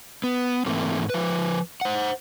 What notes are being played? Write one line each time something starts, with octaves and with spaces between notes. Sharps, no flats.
B3
G#2 E3 A3 A#3 C4
F3 B4
C5 F#5